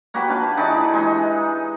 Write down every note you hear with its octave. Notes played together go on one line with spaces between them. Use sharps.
A#3 F#4 G4 B4
B4 F5 A5 B5
E3 D#4 G#4 D5
G#3 D#4